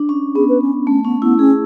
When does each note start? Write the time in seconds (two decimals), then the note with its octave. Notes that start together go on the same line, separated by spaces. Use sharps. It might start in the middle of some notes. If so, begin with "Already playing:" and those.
Already playing: D4
0.09 C#4
0.35 B3 G#4
0.49 B4
0.62 C#4
0.87 A3 C#4
1.04 B3 C#4
1.22 B3 E4
1.39 C#4 G#4